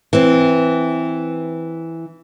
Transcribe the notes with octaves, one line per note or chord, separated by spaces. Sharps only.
E3 C4